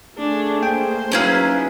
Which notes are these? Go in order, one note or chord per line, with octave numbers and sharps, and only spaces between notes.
A3 D4 G#4
A#3 C5 G5
F#3 C#4 D#4 E4 G#4 B4 F5